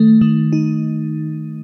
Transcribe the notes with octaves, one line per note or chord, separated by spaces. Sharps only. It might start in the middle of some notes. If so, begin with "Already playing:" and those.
Already playing: D#3 A3
D#3
D#4